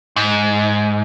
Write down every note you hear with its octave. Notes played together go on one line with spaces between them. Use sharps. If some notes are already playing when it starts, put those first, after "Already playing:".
G#2